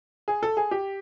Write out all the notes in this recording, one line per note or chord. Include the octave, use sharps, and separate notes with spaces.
G#4
A4
G#4
G4